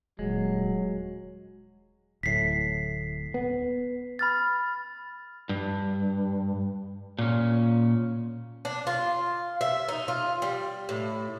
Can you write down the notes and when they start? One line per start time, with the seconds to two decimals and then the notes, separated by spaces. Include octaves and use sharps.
0.19 D#1 F#3 G#3
2.23 D1 A2 B6 C7
3.34 B3
4.19 B5 F6 A6
5.49 G2
7.19 A#2 C#4
8.65 D4
8.87 F4
9.61 E5
9.88 D#4
10.08 F4
10.42 G3
10.89 A2